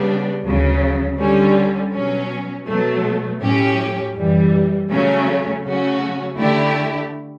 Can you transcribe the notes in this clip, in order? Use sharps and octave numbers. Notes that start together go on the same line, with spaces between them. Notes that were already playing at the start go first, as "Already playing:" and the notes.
Already playing: C#3 G3 B3 D4
D2 C#3 F#3
D3 G3 C#4
B2 F#3 C#4
B2 F#3 A3
A2 F#3 C#4 G4
F#2 E3 G3
C#3 F#3 A3 C#4
C#3 F#3 A3 C#4 F#4
D3 A3 E4 G4